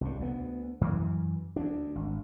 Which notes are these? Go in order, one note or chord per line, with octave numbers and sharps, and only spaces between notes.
C2 G2
D2 B3
F#2 E3
D2 D4
G#1